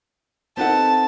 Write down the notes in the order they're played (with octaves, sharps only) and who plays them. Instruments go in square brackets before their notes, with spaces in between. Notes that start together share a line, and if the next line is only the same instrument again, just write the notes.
[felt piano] C4 D#4 A4 [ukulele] G4 B4 F#5 [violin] A5